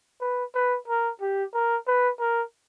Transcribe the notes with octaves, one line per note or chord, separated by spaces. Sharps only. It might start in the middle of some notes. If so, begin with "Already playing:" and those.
B4
B4
A#4
G4
A#4
B4
A#4